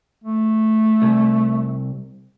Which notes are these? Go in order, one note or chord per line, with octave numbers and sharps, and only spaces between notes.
A3
C2